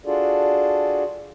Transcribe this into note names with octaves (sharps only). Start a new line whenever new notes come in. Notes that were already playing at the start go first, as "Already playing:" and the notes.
D4 F4 F#4 G#4 A4 D5